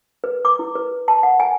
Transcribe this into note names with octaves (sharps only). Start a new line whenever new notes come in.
B4
D6
E4
B4
A5
F#5
G#5